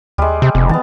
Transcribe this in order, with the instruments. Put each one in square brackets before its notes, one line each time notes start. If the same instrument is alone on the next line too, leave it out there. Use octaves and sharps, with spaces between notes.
[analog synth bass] D#2 [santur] G3 G#3
[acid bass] C3
[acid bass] F1 [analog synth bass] C3
[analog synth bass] E3 [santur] B3 A5